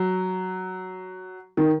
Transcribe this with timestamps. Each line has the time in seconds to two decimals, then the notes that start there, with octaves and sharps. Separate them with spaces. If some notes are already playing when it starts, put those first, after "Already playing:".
Already playing: F#3
1.57 D#3